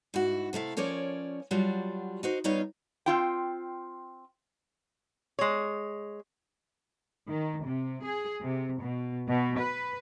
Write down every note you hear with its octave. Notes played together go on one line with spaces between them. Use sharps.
G#2 E4 F#4
C3 A3 E4 F5
F3 C#4 A#4 C#5 D5
F#3 G3 D4 F4 F#4
D#4 F#4 C5
G3 B3 D#4 F4 C#5 F5
C4 F4 G5
G#3 C#5
D#3
C3
G#4
C3
B2
B2
B4